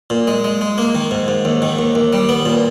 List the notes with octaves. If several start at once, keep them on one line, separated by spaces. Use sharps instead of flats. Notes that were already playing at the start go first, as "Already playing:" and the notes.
A#2
G#3
G#3
G#3
A#3
D#3
G#2
G#2
D#2
D#3
D#2
D#2
G3
B3
A#2